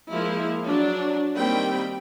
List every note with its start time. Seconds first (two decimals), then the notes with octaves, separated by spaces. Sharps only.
0.11 F3 G#3 A#3 E4
0.66 F#3 D4
1.35 D#3 G3 A#3 C4 G5 B5